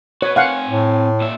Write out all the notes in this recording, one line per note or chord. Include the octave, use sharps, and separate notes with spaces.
F#4 B4 C#5
C4 F5 F#5 G#5
A2
A#2 E5